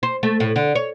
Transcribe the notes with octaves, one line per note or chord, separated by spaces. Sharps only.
C5
A3
A2
D3
C#5